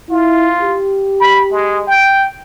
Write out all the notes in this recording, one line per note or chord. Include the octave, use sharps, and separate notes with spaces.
E4 F4
G4
B5
G#3
G5